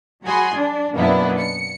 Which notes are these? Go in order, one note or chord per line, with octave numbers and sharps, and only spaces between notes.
F#3 F#4 G#4 G#5 B5 C6
D4
F#2 B2 A#3 B3 D4 E4
C#7